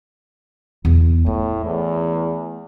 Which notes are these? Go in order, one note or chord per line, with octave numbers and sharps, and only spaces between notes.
E2
A2 A3
E2